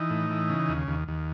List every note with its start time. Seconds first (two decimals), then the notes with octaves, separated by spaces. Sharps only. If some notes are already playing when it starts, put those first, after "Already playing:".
Already playing: E3 D#4
0.10 A2
0.30 E3
0.50 C#3
0.69 D#2
0.88 D#2
1.08 D#2